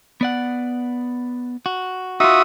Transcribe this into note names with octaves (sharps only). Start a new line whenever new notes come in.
B3 D5 F#5
F#4
D#4 F4 F#4 E5 D#6